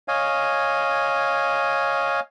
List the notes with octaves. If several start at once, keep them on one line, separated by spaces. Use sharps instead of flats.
C#5 D#5 F5 G#5